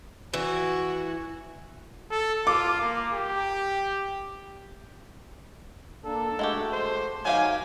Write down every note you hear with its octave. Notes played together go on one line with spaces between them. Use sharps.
E3 F#4
A4
F4 D6
A#3
G4
A#3 D4 A4
G#3 A3 F#4 G4
C5
D#3 F#3 G4 F5 G#5